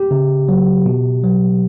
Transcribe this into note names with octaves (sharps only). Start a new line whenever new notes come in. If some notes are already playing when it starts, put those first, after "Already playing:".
Already playing: G4
C#3
F#3
B2
F#3